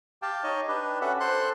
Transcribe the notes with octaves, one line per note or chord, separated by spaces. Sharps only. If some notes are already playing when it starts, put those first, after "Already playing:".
G4 F5 G5 A5
D#4 C#5 D#5
D4 G4 B4
C#4 F#4 A4 B4 E5 F#5
A4 C5 C6 F#6